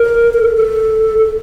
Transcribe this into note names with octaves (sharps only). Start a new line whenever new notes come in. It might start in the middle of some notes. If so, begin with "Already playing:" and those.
Already playing: A#4
A#4
A4
A4
A4